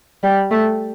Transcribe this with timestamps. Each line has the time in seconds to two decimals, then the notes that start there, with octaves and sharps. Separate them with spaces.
0.23 G3
0.51 A3